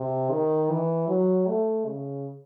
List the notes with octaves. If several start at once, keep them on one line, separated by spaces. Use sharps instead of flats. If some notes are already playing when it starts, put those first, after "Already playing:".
Already playing: C3
D#3
E3
F#3
A3
C#3